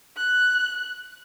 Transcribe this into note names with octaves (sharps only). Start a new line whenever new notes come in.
F#6